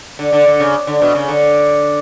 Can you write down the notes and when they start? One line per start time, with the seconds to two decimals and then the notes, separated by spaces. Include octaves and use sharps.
0.19 D3
0.32 D3
0.46 D3
0.60 C#3
0.87 D3
1.02 B2
1.15 C#3
1.28 D3